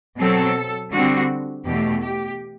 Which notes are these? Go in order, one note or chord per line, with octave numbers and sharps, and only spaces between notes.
B2 F#3 C4 A4
D3 G3 C4 F#4
E2 B2 A3 G4
G4